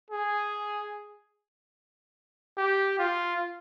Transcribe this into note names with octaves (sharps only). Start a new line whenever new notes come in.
G#4
G4
F4